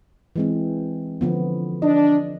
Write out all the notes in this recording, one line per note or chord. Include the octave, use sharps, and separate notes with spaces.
E3 G#3 C4
D3 F3 B3
D4 D#5